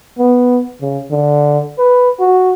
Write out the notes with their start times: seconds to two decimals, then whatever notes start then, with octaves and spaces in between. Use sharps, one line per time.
0.19 B3
0.81 C#3
1.11 D3
1.79 B4
2.20 F#4